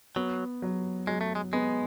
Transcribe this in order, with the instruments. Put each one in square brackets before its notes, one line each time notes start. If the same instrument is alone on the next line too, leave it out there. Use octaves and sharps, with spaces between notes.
[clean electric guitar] F#3 [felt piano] B3
[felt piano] F#3
[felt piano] F#3 [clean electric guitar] G#3
[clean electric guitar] A3
G#3
[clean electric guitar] G#3 [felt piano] B3